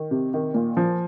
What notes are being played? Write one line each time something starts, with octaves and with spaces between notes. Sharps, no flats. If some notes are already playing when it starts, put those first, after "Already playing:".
Already playing: D#3
C3
D#3
A#2
F3